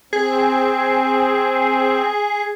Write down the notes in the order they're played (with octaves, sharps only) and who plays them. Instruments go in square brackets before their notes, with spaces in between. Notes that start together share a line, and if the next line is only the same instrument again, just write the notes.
[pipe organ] C4 [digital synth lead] G#4